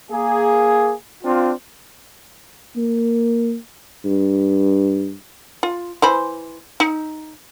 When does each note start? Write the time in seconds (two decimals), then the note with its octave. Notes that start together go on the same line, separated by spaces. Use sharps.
0.11 A#3 G#4
1.23 C4 D4 F4
2.77 A#3
4.05 G2
5.63 F4
6.02 E3 C5 B5
6.80 D#4